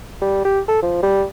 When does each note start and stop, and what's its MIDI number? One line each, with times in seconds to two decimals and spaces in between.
0.21 0.45 55
0.45 0.60 67
0.68 0.81 69
0.82 1.00 53
1.03 1.24 55